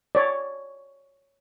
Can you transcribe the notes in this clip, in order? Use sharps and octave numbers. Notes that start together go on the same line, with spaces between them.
C#5 D5